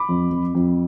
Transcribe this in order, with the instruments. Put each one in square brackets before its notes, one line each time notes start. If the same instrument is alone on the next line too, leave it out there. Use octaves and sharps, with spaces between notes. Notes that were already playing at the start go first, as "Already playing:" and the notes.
Already playing: [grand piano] B5 D6
F2
F2
F2